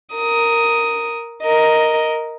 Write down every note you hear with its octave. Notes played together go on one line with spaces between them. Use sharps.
A#4 D#6
A#4 D#5